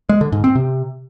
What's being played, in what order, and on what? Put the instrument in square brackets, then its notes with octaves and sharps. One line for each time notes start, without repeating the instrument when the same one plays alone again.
[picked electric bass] G#3
D3
G#2
C4
C3